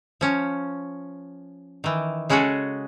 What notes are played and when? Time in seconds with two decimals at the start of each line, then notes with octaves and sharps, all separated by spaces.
0.21 F3 C#4
1.84 D#3 E3
2.29 C#3 G#3 C#4 F#4 G#4 A4